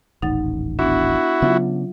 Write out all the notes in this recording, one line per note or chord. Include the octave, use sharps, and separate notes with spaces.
D#1 A1 D#4 F#5 A6
B3 D4 E4 F#4
C#3 F#3 B3 D4 F4 E5